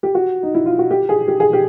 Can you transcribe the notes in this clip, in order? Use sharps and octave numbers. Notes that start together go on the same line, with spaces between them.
G4
F#4
D#4
E4
F4
F#4
G4
G#4
G4
G#4
G4